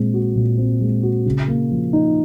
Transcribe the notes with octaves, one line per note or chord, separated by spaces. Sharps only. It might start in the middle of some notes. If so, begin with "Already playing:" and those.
Already playing: A#2 G#3 C4
F#4
A#2
C4
G#3
F#4
C#3
A#3
F3
D#4